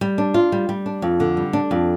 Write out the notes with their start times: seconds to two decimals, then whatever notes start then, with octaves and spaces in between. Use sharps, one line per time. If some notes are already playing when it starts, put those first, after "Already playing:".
0.01 G3
0.18 D4
0.34 F4
0.52 G3
0.69 G3
0.86 D4
1.02 F2
1.20 D3
1.37 G3
1.53 D4
1.71 F2